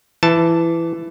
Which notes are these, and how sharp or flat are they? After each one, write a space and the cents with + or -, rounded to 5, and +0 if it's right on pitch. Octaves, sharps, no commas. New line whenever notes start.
E3 +15 A5 +0